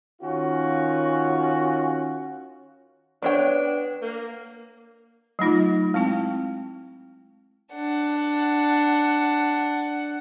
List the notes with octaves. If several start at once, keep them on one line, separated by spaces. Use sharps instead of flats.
D#3 C#4 F4 F#4
B3 D4 C#5 G5
A#3
F#3 A3 D#4 F4
G#3 C4 E4 G5
D4 F#5